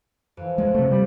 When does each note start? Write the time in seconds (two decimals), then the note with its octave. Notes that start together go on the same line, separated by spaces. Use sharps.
0.37 F2 E3
0.58 D2 G#3
0.75 C3 A3
0.91 G3